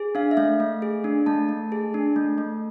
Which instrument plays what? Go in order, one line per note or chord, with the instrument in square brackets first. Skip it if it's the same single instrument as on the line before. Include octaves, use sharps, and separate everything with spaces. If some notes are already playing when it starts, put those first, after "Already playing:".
Already playing: [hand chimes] G#4
D4 F5
E5
A3 F5
A3
G#4
D4
A3 A5
A3
G#4
D4
A3
A3